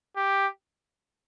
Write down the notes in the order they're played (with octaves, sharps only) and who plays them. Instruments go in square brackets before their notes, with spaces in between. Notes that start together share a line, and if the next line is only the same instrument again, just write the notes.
[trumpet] G4